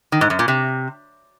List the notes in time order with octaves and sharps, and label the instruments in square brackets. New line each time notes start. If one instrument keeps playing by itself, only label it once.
[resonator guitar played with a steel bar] D#3
G#2
F#2
A#2
C3